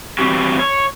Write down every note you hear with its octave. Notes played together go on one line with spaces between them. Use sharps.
G2 E3 C4 F#4 G4
C#5